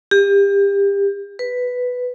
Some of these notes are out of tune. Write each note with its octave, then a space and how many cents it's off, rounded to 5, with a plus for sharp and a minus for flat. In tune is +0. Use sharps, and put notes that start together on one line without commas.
G4 +30
B4 +5